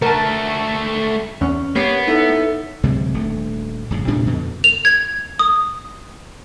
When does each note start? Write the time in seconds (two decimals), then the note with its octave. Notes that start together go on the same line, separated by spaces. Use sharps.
0.02 A3 F#4 A#4 A5
1.41 E2 C#4
1.76 A#3 B3 G4 C#5 C7 D7
2.07 D#4 E4 A4 C#5
2.84 D2 C3 F#3 G#3
3.14 D#1 D2 A3
3.90 D1 F#2 C#3
4.08 A2 C3 G3 D4
4.25 F2 B2 D3
4.64 F7
4.85 G#6
5.39 D#6